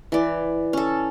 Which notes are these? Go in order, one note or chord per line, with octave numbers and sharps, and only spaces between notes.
E3 D5
C#4 A4